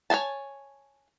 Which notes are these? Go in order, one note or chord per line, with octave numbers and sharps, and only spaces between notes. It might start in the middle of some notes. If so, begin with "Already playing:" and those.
C#5 D#5 G#5 A5